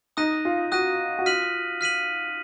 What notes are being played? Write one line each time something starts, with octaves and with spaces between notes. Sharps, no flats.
D#4 D#6 F#6 A#6 D#7
F4
F#4 D#6 F#6 A#6 D#7
F#4
F4 F6 B6 D#7 F#7
F6 B6 D#7 F#7